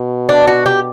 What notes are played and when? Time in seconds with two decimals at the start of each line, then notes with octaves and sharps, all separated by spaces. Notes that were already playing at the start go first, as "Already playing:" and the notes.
Already playing: B2
0.29 D4
0.47 F#4
0.66 G4